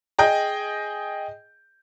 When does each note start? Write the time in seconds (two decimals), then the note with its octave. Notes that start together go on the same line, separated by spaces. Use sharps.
0.19 G#4 D#5 G5